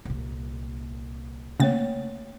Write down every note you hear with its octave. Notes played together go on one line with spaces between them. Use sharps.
C2 A#2
C#3 A3 A#3 C#5 A6